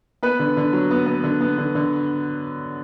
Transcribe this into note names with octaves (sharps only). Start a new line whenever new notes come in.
B3 B4
D3
D3
F#3
B3
B3
D3
B3
D3
D3